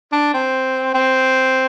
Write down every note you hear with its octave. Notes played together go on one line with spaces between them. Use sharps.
D4
C4
C4